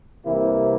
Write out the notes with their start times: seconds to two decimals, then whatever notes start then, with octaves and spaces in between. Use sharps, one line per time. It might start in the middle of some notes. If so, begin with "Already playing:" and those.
0.24 C2 C3 E3 A#3 E4